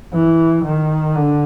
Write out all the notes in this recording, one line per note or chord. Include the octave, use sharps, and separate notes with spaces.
E3
D#3
D3